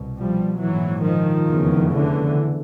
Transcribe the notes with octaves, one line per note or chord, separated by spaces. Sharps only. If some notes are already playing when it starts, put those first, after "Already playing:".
Already playing: C2 B2
F3 G3
A#1 G#2 E3 F#3
D#3 F3
F1 E2 C#3
D3 E3